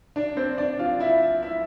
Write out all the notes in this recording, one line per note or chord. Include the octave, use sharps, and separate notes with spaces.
D4 D5
C4 C5
D4 D5
F4 F5
E4 E5
E4 E5